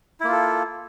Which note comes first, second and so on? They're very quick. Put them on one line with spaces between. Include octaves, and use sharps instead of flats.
E4 A#3 F4 A4